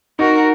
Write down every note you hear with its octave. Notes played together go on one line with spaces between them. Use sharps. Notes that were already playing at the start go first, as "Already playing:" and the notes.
D#4 F#4 A#4